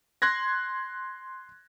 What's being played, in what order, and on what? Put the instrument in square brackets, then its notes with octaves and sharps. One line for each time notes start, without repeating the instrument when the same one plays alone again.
[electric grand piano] C6 F#6 G#6 A#6